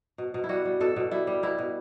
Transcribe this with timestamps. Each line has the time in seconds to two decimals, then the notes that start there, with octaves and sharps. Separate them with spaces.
0.18 B2
0.34 B2
0.44 E4
0.49 G3 F#4
0.65 G3
0.80 B2 A4
0.96 B2
1.11 G3 E4
1.27 G3
1.43 B2 E4
1.58 B2